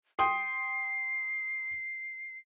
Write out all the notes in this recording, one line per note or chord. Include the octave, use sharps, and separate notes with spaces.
G5 C6 D#6 C7